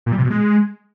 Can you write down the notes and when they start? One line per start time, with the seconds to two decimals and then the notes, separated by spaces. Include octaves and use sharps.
0.06 A#2
0.12 G3
0.18 C3
0.24 B2
0.30 G#3